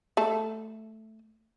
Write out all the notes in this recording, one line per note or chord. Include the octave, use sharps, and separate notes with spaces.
A3 A4